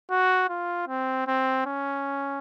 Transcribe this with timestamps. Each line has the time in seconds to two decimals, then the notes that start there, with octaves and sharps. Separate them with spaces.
0.11 F#4
0.49 F4
0.88 C4
1.27 C4
1.66 C#4